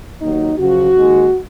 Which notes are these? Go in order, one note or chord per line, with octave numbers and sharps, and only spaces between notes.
D#2 D#3 F#3 D#4
F#2 C#3 F3 F#4
D#2 D#3 G#3